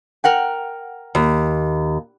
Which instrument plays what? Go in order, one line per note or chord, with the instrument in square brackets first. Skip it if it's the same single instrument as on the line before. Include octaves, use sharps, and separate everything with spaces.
[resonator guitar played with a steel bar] A#4 F#5 G5
[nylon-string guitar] D#2